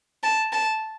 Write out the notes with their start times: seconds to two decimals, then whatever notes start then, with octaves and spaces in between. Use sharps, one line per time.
0.23 A5
0.53 A5